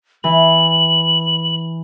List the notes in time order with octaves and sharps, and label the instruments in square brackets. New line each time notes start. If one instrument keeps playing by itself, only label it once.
[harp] E3 [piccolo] F#7